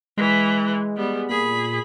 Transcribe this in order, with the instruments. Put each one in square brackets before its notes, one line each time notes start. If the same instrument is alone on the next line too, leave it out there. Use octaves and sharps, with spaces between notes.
[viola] E3 [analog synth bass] G#3
[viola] G3 B3
[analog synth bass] A#2 [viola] G#4 B5